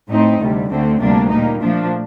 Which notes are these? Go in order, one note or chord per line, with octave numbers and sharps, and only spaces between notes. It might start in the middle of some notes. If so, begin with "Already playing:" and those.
A2 A3 C4 D#4
D2 C3 G3
D2 D3 A3 C4
D2 C3 G3 A#3 D4
A#2 G3 A#3 D#4
A#2 F3 A3 D4